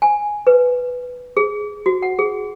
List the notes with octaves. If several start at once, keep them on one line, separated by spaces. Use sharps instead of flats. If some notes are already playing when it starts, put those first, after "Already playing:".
G#5
B4
G#4
F#4
F#5
G#4